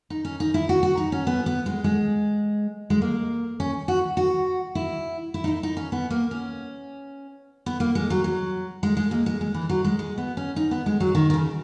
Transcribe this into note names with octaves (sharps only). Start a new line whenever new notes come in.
D#4
C#4
D#4
E4
F#4
F#4
D#4
C#4
B3
B3
G#3
G#3
G#3
A#3
C#4
F#4
F#4
E4
E4
D#4
E4
D#4
C#4
B3
A#3
C#4
B3
A#3
G#3
F#3
F#3
G#3
G#3
A#3
G#3
G#3
E3
F#3
G#3
G#3
B3
C#4
D#4
B3
G#3
F#3
D#3
D#3
C#3